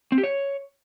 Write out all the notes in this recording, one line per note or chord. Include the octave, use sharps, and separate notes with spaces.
C4
G4
C#5